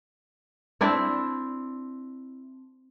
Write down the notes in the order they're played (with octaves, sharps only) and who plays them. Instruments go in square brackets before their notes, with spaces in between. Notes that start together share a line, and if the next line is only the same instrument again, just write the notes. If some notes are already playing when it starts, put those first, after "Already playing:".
[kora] C4 D4 E4 D5